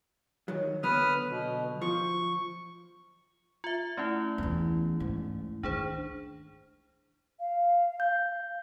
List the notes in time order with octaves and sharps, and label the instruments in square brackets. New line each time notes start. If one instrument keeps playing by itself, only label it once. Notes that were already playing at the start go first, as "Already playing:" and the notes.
[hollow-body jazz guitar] D#3 F#3
[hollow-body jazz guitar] D3 F#3 B3 [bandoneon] B4 D#6 F6
[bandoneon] B2
[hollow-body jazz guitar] F3 [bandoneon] C#6
[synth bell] F4 E5
A3 C#4 E4
[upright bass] E2 E3
G#2
[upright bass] D#3 [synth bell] D4 G#4 C5
[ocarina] F5
[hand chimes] G6